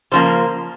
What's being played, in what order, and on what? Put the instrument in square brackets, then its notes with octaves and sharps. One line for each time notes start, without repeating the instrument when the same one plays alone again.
[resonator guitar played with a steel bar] C#3 F3 A#3 C5